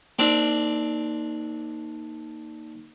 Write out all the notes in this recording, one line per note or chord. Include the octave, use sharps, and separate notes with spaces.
A#3 C4 D4 D#4 G4